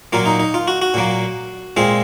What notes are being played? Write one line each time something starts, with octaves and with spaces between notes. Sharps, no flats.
A#2 F#3 A#3 F4
D#4
D#4
F4
F#4
F#4
A#2 F#3 A#3
A#2 G#3 C4 F4